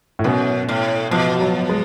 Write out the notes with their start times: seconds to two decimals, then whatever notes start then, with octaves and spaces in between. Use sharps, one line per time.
0.19 A2
0.24 F#2 B2
0.69 A2
1.11 B2 F3
1.41 F#3
1.69 G#3